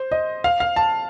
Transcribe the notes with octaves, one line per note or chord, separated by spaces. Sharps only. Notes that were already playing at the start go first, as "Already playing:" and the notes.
Already playing: C5
D#5
F5
F5
A5